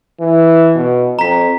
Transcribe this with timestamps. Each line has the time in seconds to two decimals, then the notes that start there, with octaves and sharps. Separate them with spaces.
0.20 E3
0.76 B2
1.19 F2 A#5 B6